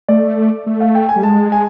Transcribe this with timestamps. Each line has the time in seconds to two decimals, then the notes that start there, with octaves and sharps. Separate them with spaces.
0.08 A3 D5
0.67 A3
0.80 F5
0.95 G5
1.09 G#5
1.16 G3
1.23 G#3 A5
1.52 G#5